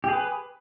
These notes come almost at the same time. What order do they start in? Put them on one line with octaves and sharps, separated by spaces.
G4 G#4 B4